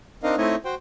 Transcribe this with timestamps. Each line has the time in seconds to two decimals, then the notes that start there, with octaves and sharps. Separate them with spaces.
0.23 C4 D4 D#4 A#4 D#5 F5
0.38 A3 C4 D#4 E4 C#5 D#5
0.65 F#4 C5 G5